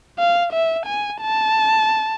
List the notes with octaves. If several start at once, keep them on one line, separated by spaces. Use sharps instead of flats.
F5
E5
G#5
A5